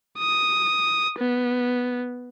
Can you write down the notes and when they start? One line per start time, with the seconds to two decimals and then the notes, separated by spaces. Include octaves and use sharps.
0.18 D#6
1.18 B3